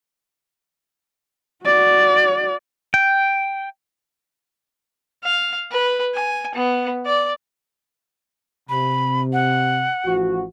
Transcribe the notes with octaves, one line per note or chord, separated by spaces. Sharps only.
F#4 D5
G5
F5
B4
G#5
B3
D5
C3 B5
F#5
A1 F3 F#4